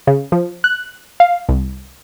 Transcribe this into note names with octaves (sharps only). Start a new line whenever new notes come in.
C#3
F3
F#6
F5
C2